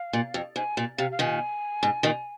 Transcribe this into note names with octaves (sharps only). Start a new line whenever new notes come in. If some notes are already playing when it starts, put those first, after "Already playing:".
Already playing: F5
A#2
F2
G#2 G#5
A#2
C3 F5
F5
A#2 D#3 G#5
G#2
A#2 D#3